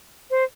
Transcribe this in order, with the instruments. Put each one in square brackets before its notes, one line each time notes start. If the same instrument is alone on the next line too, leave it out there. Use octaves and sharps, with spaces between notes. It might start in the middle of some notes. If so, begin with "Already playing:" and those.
[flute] C5